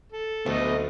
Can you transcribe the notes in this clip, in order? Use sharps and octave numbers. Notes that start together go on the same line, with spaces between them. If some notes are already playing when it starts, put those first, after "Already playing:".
A4
D2 F#3 A3 B3 D#5